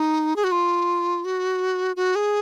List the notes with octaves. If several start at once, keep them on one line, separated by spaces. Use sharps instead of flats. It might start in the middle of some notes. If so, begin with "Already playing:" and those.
Already playing: D#4
G#4
F#4
F4
F#4
F#4
G#4